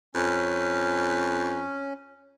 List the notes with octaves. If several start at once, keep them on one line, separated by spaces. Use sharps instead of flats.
F2 C#4